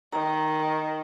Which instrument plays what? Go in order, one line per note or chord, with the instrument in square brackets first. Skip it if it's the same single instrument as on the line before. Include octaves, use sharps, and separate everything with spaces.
[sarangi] D#3 [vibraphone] A#5